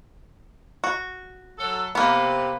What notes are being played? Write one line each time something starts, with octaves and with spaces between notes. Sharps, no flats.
F#4
F#3 A4
C3 A#3 B3